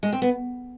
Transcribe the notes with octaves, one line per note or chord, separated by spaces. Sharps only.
G#3
C4
B3